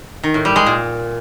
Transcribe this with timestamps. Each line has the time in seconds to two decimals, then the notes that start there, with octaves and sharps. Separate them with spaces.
0.23 D#3
0.34 A2
0.45 G3
0.56 G#3
0.66 A#2